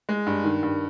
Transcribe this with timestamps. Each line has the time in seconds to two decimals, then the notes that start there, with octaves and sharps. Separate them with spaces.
0.09 G#3
0.27 G2
0.44 D#3
0.63 G2